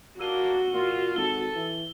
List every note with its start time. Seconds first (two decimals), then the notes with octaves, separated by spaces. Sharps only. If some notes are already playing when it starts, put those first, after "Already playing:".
0.20 A#3 D4 F#4 E6 D#7 G7
0.74 A#2 F4
1.16 G#1 A4 G7
1.55 E3